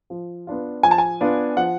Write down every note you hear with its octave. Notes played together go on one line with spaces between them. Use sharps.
F3
B3 D4 F4
F3 G#5
A5
G#5
B3 D4 F4
F3 F#5